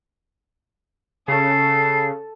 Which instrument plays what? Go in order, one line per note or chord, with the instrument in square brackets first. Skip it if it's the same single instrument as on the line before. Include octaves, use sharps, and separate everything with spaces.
[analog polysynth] C#3 [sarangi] A4 [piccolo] C7